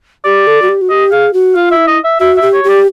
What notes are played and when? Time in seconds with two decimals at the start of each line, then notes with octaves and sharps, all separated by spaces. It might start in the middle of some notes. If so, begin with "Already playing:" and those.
0.25 G4 D5
0.47 A4
0.62 F#4
0.69 G4
0.81 F#4
0.89 G4 D#5
1.12 G#4 F5
1.33 F#4
1.55 F4 F5
1.71 E5
1.77 E4
1.87 D#5
2.04 E5
2.20 F#4 E5
2.37 G4 E5
2.53 C#5
2.64 G4 D5